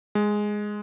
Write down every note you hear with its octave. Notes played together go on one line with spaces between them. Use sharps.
G#3